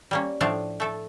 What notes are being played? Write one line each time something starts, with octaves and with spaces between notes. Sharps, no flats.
G3 A#3 C#4
A2 F3 A3 D4 D5 F5
A3 A4